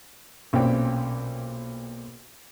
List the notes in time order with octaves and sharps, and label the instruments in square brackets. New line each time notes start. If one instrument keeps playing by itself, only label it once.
[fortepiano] B1 A#2 C4 C#4 G5